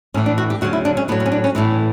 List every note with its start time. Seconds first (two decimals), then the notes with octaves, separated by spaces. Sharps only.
0.14 A2 E3 C#4
0.26 D4
0.38 F#4
0.50 G4
0.61 D2 C#3 F#3 F#4
0.73 E4
0.85 D4
0.97 C#4
1.08 A2 B3
1.12 F#3
1.20 B3
1.26 C#4
1.32 D4
1.44 C#4
1.55 A2 E3 B3